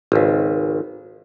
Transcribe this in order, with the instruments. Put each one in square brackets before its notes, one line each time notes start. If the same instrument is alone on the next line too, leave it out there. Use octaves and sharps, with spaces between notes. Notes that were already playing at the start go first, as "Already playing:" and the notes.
[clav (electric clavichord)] G#1 C#2